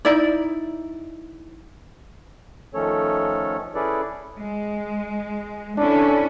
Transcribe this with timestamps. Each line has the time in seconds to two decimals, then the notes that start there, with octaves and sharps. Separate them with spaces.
0.05 D#4 E4 D5
2.73 D#3 F3 A3 C#4 A4 C#5
3.75 C#4 E4 G#4 A4 B4 D5
4.39 G#3
5.78 C#4 D4 E4 A4